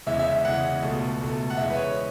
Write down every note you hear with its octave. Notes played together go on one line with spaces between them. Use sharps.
E2 C#3 E3 G#3 E5
E5
E5
E2 C#3 E3 G#3 F#5
C#2 B2 A3
C#2 B2 A3
F#5
E2 C#3 G#3 E5
B4
C#5